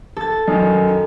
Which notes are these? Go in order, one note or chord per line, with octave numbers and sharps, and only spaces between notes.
A4 A6
F#2 D#3